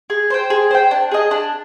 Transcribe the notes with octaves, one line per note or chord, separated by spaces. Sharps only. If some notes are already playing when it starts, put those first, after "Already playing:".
G#4
C5 G5
G#4
C5 G5
D4
G#4 D#5
D4